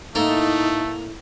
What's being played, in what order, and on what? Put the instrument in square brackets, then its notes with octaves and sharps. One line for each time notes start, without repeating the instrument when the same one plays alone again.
[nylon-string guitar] A2 E4 [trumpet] A3 [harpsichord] A#3 A4 A#4 [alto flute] D#4